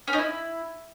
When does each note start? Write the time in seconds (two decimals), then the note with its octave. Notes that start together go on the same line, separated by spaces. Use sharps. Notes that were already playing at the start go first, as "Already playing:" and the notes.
0.08 C#4
0.13 D#4
0.18 E4